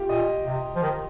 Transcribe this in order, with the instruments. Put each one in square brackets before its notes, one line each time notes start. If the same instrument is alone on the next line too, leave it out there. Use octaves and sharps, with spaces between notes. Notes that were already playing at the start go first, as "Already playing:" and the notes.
Already playing: [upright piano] F4 G4
[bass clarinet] A#2 [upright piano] D#5
[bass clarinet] C3
F3
D#3